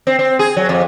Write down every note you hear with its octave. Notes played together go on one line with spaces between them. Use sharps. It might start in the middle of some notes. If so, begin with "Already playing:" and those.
C4
C4
G#4
F#3
F2